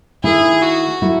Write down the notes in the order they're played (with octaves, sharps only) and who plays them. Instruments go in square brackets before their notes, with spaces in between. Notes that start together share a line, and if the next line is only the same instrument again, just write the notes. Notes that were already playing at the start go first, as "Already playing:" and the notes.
[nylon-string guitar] D#3 A3 E4 [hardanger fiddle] G#4
[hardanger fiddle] F#4
[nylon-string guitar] F#3 A3 E4